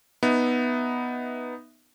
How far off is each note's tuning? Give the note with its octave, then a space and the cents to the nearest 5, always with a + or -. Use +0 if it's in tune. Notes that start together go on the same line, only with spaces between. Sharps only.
B3 +0 D#4 +0 E5 +0